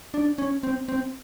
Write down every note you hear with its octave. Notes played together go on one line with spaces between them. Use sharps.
D4
C#4
C4
C4